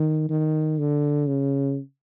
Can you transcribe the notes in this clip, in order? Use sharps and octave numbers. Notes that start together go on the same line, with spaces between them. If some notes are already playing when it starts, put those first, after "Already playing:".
Already playing: D#3
D#3
D3
C#3